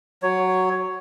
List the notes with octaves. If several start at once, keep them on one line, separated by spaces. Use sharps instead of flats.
F#3 C#5